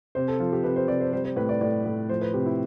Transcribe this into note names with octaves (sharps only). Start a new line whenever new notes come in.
C3 C5
A4
F3 F4
G4
C3 B4
C5
C3 D5
C5
G3 C5
C5
A2 B4
D5
A2 D5
A2
F3 C5
B4
C3 G4
E4